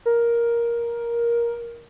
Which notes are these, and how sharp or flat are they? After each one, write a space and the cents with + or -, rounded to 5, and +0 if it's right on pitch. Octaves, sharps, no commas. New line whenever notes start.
A#4 +10